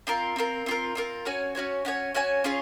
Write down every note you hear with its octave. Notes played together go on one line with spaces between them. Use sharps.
C4 F4 A#4
C4 F4 A#4
C4 F4 A#4
C4 F4 A#4
C#4 F#4 C#5 G#5
C#4 F#4 C#5 G#5
C#4 F#4 C#5 G#5
C#4 F#4 C#5 G#5
C#4 F4 G#4 C#5